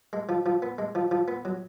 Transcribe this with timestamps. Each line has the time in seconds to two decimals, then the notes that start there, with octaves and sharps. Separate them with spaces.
0.13 G#3
0.29 F3
0.46 F3
0.62 B3
0.78 G#3
0.95 F3
1.11 F3
1.28 B3
1.45 F#3